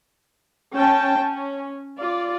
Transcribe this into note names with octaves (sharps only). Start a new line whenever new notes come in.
C#4 G5 A5
C#4
F4 D5